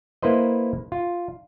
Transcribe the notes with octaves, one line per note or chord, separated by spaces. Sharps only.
A#3 E4 B4 C5 D#5
F4